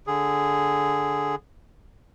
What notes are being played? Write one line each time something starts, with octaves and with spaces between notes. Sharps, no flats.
D3 G#4